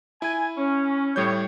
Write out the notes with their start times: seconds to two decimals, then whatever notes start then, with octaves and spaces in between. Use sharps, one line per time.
0.22 E4 G#5
0.57 C#4
1.16 A2 G3 C#5 G6